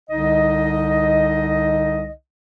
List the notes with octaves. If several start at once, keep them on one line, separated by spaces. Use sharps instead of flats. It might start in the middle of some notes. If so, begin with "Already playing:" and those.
C2 D3 D#4 D#5